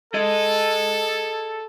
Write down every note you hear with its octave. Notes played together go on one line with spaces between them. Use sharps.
G#4 A4 D#5